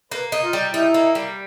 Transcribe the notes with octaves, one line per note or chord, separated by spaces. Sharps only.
A#3 B4
D#4
F4
G3
D#4 E4
A#3
G3